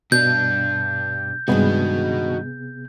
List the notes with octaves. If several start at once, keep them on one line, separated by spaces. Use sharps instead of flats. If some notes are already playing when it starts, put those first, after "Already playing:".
G2 B2 D4 G6
G2 C3 D#3 G#3 B3 F#4 G#4 D#5